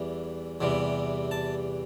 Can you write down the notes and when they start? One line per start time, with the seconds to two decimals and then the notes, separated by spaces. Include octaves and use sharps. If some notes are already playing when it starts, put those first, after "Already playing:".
Already playing: E2 E3 G3
0.61 E2 C3 E3 G3
1.31 A5